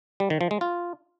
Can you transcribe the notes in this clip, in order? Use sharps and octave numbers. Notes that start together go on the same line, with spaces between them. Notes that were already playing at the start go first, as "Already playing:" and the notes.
G3
D#3
F3
G#3
F4